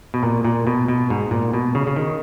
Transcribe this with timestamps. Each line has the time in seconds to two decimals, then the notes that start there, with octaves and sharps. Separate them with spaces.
0.14 B2
0.23 A#2
0.45 A#2
0.67 B2
0.88 B2
1.10 G#2
1.31 A#2
1.54 B2
1.75 C#3
1.87 C#3
1.96 D#3